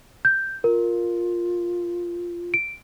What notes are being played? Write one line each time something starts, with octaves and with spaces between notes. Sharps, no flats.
G6
F4 A#4
D7